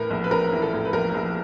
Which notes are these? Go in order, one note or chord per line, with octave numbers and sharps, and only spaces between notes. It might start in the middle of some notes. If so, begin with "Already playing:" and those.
Already playing: A2 E3 A#4 B4
A#1
B4
A#1 A#4
E3
A4
A2
B4
A#1 A#4
A#1